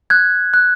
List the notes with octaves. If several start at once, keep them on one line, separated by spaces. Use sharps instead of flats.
F#6 G#6
F#6